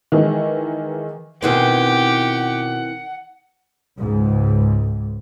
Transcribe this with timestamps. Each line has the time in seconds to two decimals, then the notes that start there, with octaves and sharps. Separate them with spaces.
0.12 D#3 E3 G#3
1.42 B2 D#3 E3 C4 E4 G4 F#5
3.98 C#2 G#2